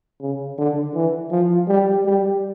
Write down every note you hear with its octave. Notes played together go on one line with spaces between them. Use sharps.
C#3
D3
E3
F3
G3
G3